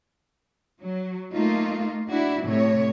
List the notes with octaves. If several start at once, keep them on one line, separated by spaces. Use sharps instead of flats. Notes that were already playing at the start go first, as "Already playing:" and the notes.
F#3
A3 A#3 D#4 F4
D4 E4 F#4
A2 C3 A3 C#5